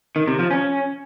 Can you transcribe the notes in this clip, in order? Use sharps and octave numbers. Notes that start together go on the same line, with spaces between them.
D#3
C3
F3
C#4